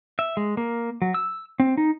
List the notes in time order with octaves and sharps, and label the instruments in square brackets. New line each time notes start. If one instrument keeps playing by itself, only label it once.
[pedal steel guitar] E5
G#3
A#3
F#3
E6
C4
D#4